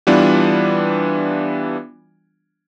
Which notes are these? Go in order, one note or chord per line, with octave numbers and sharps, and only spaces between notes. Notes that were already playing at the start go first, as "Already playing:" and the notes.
E3 G3 B3 D4 F4